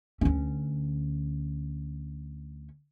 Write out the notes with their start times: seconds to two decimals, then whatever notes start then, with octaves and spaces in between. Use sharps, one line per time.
0.21 D2 C#4